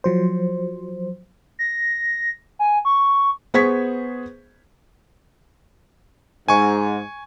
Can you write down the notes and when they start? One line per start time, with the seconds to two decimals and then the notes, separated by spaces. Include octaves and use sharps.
0.04 F3 F#3 C5
1.59 A#6
2.59 G#5
2.85 C#6
3.54 B3 G#4 C5 C#6 G#6 B6
6.48 G#2 G#5 C#6